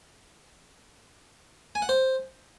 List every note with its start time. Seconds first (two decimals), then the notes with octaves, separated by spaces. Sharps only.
1.75 G#5
1.82 F#5
1.89 C5